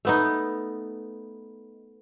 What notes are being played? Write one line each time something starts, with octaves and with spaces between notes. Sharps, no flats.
A3 B3 D#4